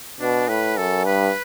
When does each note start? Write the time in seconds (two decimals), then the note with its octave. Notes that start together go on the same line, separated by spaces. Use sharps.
0.20 B2 D4
0.48 A2 B4
0.77 F#2 A4
1.06 G2 B4